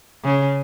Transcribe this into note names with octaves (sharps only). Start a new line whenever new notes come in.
C#3